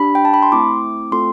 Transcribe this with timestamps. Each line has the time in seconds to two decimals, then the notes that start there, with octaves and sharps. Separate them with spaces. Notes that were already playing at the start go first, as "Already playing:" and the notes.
Already playing: D4 G4 B5
0.15 G5
0.25 A5
0.34 B5
0.43 C6
0.52 A3 C4 E4 D6
1.12 A3 C4 F4 A4 C6